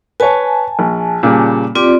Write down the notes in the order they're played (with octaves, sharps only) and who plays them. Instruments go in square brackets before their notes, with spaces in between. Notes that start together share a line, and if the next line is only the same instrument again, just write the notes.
[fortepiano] B4 C#5 [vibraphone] G#5 A5
[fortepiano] A#1
A#2 C#3 G3
[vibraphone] C4 F4 D5 [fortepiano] G4